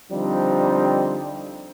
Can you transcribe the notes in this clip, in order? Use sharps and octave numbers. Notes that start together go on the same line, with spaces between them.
D3 F3 G3 C4 D4 D#4